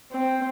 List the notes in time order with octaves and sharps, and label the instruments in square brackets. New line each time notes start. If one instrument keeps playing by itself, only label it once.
[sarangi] C4